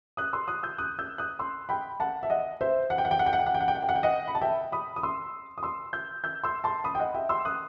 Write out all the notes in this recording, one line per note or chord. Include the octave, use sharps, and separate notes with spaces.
D#6 F#6
C6 E6
D#6 F#6
E6 G6
D#6 F#6
E6 G6
D#6 F#6
C6 E6
G5 B5
F#5 A5
E5
D#5 F#5
C5 E5
F#5
G5
F#5
G5
F#5
G5
F#5
G5
F#5
G5
F#5
G5
F#5
G5
F#5
G5
D#5 F#5
B5
A5
E5 G5
B5 D#6
D#6
C6 E6
D#6
C6 E6
E6 G6
E6 G6
C6 E6
A5 C6
B5 D#6
G5
D#5 F#5
E5 G5
C6 E6
D#6 F#6